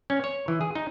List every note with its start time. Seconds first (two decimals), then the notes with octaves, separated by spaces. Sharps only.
0.10 C#4
0.24 C#5
0.48 E3
0.61 G#4
0.75 D#4